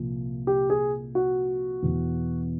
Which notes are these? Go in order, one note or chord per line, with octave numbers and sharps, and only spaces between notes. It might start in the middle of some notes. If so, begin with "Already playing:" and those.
Already playing: C2 A#2 F3
G4
G#4
F#4
E2 B2